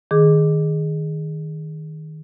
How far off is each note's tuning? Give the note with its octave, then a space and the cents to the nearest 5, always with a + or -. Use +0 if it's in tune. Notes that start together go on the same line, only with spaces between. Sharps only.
D#3 +0 G#4 +0 D6 +0